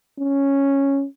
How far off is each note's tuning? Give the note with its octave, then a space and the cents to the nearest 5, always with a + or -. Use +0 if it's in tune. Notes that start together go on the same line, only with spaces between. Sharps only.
C#4 -5